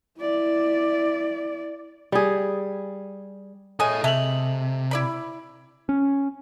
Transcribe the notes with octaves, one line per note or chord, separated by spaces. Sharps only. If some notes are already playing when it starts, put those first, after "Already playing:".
E4 D5
G3 G#4
G#3 A4 C#5 G#5 D#6
C3 G#3 A3 A4 E5 F7 F#7
E4 D5 B5
C#4